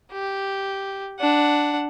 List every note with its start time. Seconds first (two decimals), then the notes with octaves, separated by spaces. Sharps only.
0.12 G4
1.19 D4 F#5